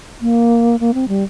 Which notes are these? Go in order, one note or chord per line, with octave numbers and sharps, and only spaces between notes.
A#3
A#3
C4
G3